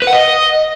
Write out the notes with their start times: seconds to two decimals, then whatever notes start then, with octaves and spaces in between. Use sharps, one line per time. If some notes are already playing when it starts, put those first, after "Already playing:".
0.02 B4
0.07 F#5
0.12 D#5